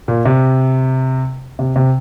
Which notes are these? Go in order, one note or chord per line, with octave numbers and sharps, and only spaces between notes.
A#2
C3
C3
C3